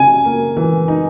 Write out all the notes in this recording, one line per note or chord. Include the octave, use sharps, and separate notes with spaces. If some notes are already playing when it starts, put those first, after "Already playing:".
Already playing: C#3 G#5
A#3
E3
D#4